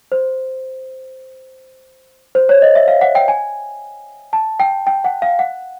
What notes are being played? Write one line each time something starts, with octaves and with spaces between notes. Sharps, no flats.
C5
C5
C#5
D#5
E5
F5
F#5
G5
G#5
A5
G5
G5
F#5
F5
F#5